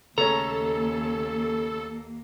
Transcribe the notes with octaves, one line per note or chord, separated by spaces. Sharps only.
D#2 C#3 A3 A#3 C#4 A4 A#5